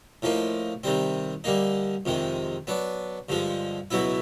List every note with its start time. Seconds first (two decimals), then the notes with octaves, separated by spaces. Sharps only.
0.22 A2 F3 A#3 D#4
0.84 C3 D#3 G3 C4
1.44 D3 G3 A#3 D#4
2.06 F2 C3 D#3 G#3
2.67 F#3 B3 D4
3.29 G2 D3 F3 G#3
3.91 C#2 B2 F#3 B3 E4